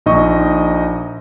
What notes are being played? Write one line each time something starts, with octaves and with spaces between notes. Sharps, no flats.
A#1 D#4 D#5 C#6